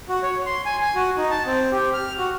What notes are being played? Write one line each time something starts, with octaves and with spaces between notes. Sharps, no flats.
F#4
C#5
C6
G#5
G#5
F#4
D#4
A5
C4
G4
F6
F#4